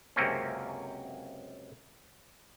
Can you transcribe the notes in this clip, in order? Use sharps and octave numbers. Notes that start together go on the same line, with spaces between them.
C#2 F#2 C3 A#3 C4 C#4